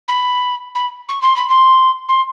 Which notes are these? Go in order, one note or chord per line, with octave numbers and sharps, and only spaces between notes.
B5
B5
C#6
C6
B5
C6
C6